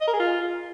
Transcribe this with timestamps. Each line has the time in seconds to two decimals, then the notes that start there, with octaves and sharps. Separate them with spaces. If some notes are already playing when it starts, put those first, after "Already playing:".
0.01 D#5
0.07 A#4
0.13 G#4
0.20 F4